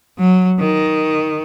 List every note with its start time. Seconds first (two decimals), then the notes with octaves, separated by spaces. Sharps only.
0.19 F#3
0.59 D#3